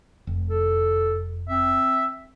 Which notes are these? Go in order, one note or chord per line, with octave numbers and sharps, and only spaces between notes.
F1
A4
C4 E5